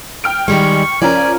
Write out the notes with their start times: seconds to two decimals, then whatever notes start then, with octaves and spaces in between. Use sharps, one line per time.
0.24 G5 F6 D7
0.48 D#3 G3 G#3 C#6
1.02 F3 C#4 A#4 D5 G#5